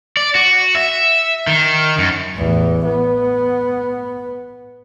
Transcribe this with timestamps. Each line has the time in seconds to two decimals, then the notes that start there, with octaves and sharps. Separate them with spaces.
0.17 D5
0.35 F#4
0.75 E5
1.47 D#3
1.98 F#2
2.34 A1 E2
2.85 B3